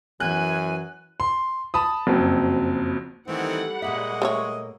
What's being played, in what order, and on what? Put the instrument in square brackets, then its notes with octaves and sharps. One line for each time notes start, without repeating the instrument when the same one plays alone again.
[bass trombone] F#2 [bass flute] E3 [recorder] G#5 [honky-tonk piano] F#6
[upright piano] C6
A5 B5 D#6
F#1 F2 F#3
[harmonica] D#3 E3 C4 [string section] G3 F#5 [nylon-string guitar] A3
[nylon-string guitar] A#2 A#3 E5 [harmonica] G#3 D#5
[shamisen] A3 C5 C#5